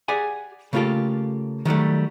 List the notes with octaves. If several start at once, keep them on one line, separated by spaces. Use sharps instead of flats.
G4 G#4 D5 F#5 G#5
C#3 A3 A#3 F4 G4 A4
D#3 F#3 G3 A3